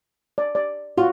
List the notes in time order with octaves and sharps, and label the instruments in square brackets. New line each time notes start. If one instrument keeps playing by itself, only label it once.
[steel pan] D5
D5
[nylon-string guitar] F4 [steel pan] F#4